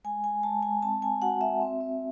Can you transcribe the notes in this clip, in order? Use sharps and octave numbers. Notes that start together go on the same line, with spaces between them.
G#3 G#5
G#3 G#5
G#3 A5
G#3 G#5
C4 A5
C4 G#5
F#4 F#5
F#4 E5
C4
C4